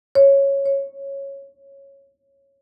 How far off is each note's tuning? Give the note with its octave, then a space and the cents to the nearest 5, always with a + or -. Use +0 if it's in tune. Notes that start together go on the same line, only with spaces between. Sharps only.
C#5 -5
C#5 -10